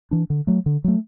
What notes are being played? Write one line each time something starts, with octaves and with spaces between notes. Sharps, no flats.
E3 D4
D3
F#3 A3
D3
F#3 A3